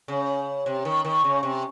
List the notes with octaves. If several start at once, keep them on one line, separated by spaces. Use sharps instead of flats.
C#3
C3
D#3
D#3
C#3
C3